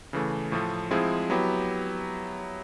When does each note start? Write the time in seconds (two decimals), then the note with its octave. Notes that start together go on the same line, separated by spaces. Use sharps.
0.13 C#3 E3 A3
0.52 A2 F3 A3
0.91 F3 G#3 C4 E4 G#4
1.30 F#3 B3 E4 G4